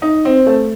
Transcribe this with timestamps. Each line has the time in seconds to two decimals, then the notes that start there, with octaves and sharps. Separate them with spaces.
0.02 D#4
0.25 C4
0.46 A3